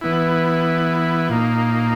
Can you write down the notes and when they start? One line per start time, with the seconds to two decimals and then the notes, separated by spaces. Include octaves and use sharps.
0.01 E3 B3 E4
1.29 A#2 A#3 D#4